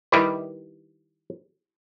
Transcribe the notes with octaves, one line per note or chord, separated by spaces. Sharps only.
D#3 G3 E4 G4 B4